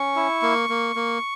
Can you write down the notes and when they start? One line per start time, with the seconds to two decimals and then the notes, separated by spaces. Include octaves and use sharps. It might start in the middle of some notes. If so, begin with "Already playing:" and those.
Already playing: C#4 C#6
0.16 E4
0.42 A#3
0.69 A#3
0.96 A#3